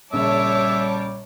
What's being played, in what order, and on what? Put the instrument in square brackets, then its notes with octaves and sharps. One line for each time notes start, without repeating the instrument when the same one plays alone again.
[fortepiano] A#1 C#3 [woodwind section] G3 [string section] C#5 A5 D6 [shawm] E5